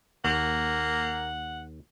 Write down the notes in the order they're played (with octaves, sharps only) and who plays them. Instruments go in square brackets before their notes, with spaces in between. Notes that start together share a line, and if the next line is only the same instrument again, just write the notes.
[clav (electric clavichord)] D#2 [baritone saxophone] A#3 [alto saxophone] F#5